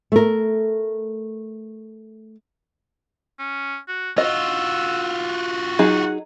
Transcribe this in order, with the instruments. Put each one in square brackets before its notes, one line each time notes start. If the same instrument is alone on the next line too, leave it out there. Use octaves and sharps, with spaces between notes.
[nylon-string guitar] A3 A#4
[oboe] C#4
F#4
[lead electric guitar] F4 F#4 [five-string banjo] D#5 [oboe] E6
[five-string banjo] F#3 D#4 G#4 [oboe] F#5